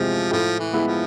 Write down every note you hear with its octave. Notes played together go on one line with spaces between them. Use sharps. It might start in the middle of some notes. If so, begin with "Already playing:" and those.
Already playing: E2 C3 F3 G#3
A2 F3
E3
G#3 B3 E4
F3